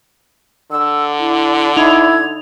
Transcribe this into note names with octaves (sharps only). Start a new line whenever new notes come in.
D3 E6
E4
D#4 E4 G#6 F7